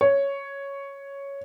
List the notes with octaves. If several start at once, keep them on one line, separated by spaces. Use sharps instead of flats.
C#5